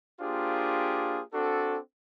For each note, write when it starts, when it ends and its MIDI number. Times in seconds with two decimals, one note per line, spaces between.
0.20 1.22 58
0.20 1.22 62
0.20 1.22 65
0.20 1.22 67
0.20 1.22 68
0.20 1.22 72
1.33 1.78 60
1.33 1.78 62
1.33 1.78 66
1.33 1.78 69